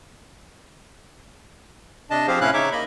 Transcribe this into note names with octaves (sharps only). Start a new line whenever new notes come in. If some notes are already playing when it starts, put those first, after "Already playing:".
C3 D4 D#5 A5
F3 C4 G4 G#4 C5 F5
A2 C3 C#4 E4 F5 F#6
C#3 D#4 C#5 E5 D6
A#3 D#5 B5